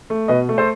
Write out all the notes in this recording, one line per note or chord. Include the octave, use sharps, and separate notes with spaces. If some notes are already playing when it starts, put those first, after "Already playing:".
A3
B2 B4 D#5
A3
A4 C5